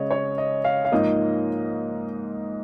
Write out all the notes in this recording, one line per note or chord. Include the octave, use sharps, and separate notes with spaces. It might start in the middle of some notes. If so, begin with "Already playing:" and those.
Already playing: C#3 G#3 C#5 D#5
C#5
D#5
F5
F5
G#2 F3 A#3 D#4 D#5